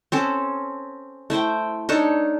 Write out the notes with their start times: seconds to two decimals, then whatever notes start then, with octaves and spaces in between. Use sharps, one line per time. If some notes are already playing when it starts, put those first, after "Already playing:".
0.12 C4 C#4 A4
1.30 A3 E4 C5 G5
1.89 D4 D#4 A4 C#5